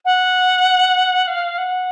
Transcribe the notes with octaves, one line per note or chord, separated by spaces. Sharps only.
F#5
F5
F#5